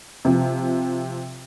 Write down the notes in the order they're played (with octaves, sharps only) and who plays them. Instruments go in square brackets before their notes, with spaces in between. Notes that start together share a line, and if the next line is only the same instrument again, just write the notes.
[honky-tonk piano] C3 F3